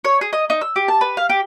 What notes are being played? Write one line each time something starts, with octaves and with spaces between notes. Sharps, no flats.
C#5
G#4
D#5
D#4
E6
G4
A5
B4
F5
G4